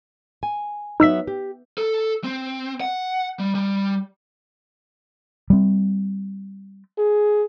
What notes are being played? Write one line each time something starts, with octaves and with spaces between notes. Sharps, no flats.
G#5
F#3 B3 D#4 E5 E6 B6
G4
A4
C4
F#5
G3
G3
G3 C4
G#4